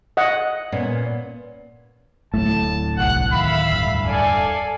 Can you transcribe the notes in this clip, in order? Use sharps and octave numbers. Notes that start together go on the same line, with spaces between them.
D#5 F#5
A#2 B3 C#4
D1 G#1 A2 A3 A5
G1 C2 F#5 F#6
D#3 E5 F5 B5
E1 G2
A4 D5 F5 G#5